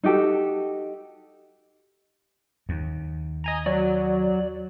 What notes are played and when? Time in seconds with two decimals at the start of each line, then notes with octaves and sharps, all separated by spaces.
0.04 D#4 F#4 G4 A4
2.69 D#2
3.44 D#5 G#5 A#5
3.66 F#3 D5